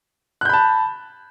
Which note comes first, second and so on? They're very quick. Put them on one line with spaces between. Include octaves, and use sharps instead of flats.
F#6 G6 B5 A5